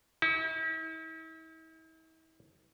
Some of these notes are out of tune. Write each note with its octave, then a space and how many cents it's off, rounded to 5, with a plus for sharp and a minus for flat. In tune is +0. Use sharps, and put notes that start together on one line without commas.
E4 -45